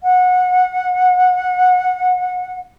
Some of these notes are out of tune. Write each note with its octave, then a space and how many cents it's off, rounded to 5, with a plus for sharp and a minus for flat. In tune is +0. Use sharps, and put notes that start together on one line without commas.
F#5 -25